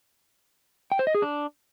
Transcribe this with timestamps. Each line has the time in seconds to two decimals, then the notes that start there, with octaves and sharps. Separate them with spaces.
0.92 G5
0.99 C5
1.07 D#5
1.15 G#4
1.22 D4